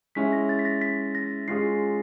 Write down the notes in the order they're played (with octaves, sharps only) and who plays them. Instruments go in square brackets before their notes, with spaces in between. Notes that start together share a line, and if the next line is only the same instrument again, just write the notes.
[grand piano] G#3 C#4 E4 [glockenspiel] B6
[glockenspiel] A#6
A6
B6
A#6
B6
A#6
[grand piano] G#3 C#4 F4 G#4 [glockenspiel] C7